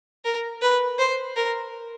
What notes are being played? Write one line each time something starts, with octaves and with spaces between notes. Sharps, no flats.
A#4
B4
C5
A#4